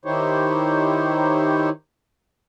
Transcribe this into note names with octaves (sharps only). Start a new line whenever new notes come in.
D#3 D#4 E4 G4 C5 C#5